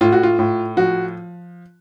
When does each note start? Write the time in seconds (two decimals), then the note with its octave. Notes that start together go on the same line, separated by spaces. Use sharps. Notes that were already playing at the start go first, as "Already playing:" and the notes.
0.01 A2 F4
0.12 F#4
0.23 F4
0.39 A2
0.77 F3 F#4